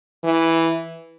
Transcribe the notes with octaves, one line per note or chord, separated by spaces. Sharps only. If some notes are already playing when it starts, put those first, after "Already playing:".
E3